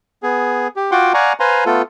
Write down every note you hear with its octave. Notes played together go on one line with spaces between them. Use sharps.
B3 G#4
G4
F4 F#4 F#5 G5 C6 D6
D5 F5 F#5 G#5 A#5 C#6
B4 C5 F5 G#5 A#5 C6
A3 B3 F4 A4